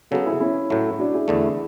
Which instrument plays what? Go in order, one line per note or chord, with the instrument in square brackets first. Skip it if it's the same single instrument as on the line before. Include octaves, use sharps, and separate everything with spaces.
[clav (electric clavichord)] C#3 F#3 B3 [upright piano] F#4 A4
[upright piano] E4 G#4
C#4 E4
[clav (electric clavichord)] A2 F#3 A3
[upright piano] D4 F#4
E4 G#4
[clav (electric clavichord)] E2 D3 A3